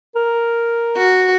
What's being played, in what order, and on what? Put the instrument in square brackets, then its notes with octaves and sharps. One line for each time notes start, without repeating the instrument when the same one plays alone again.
[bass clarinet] A#4
[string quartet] F#4